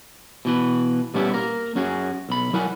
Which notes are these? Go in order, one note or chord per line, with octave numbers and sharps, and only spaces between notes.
B2 E3 B4
A#2 G3 B3 C#4 E4 G4
A#3 A#4
F#2 C#4 F#4 G#4
B1 B5
F#3 E4 A#4 F#5 G#5 B5